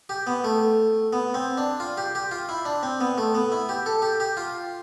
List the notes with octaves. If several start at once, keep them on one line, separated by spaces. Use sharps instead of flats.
G4
B3
A3
B3
C4
D4
F4
G4
G4
F4
E4
D4
C4
B3
A3
B3
E4
G4
A4
G4
G4
F4